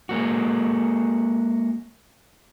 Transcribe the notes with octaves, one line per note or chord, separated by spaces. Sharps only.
G#3 A#3 F#4